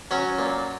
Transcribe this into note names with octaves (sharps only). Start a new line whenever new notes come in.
F#3 C#4
A#2